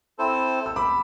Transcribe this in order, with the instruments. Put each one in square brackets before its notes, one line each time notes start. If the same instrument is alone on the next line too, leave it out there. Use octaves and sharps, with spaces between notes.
[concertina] C4 E4 A4 C5
[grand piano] E6
B5 D6